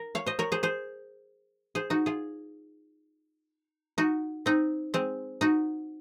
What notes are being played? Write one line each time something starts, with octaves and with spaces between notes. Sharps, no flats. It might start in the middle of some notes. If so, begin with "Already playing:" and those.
Already playing: A#4
C#5 F5
C5 D#5
A#4 C#5
G#4 C5
G#4 C5
G#4 C5
D#4 F#4
F4 G#4
D#4 F#4
C4 D#4
G#3 C4
D#4 F#4